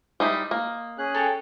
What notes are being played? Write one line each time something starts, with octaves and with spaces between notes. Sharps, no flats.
G3 D#4 E4 D#5 C6
A#3
C#4 G#4 F#6
A4 C#5 G5